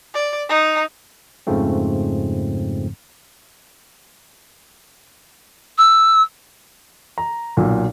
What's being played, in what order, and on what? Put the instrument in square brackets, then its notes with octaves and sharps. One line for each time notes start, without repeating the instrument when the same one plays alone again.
[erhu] D5
D#4
[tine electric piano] F2 G#2 C#3 F3 A3 C4
[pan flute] E6
[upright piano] A#5
B1 A#2